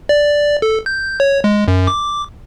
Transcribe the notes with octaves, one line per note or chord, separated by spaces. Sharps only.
D5
A4
G6
C#5
G#3
F#2
D6